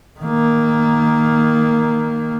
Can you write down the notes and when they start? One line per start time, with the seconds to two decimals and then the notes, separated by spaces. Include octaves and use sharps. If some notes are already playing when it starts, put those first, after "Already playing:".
0.20 D#3 A#3